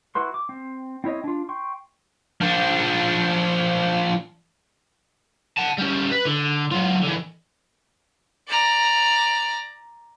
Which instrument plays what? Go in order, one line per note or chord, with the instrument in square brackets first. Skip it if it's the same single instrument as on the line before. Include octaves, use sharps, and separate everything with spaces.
[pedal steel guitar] E4 F#4 B4 C6
D6
C4
C4 E4 C#5 D#5
D4 F4
G5 C6 C#6
[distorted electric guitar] F3 D4
[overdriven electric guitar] F#5 A5
G3 C#4
B4
D3
F#3 F4
D3 E3
[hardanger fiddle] D5 A#5